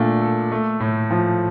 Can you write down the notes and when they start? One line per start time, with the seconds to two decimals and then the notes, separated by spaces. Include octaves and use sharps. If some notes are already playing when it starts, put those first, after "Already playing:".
Already playing: A#2 A3 D4
0.22 A4
0.52 A3
0.80 A2
1.11 F3